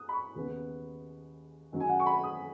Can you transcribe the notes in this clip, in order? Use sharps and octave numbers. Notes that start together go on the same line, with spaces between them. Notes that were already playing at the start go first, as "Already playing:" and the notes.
Already playing: D#6 F#6
B5
C#6
D#2 C#3 B3
F#2 D#3 F#3
G#5
F#5
C#6
B5
D#6